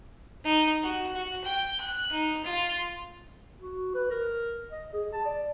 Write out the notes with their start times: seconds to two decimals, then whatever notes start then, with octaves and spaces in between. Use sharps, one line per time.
0.44 D#4
0.83 F#4
1.14 F#4
1.44 G5
1.80 F#6
2.11 D#4
2.44 F4
3.60 F#4
3.95 B4
4.10 A#4
4.72 D#5
4.93 G#4
5.13 A5
5.26 D5